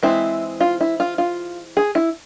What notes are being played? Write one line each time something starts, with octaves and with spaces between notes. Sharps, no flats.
E3 G#3 C4 E4
F4
E4
F4
F4
G#4
E4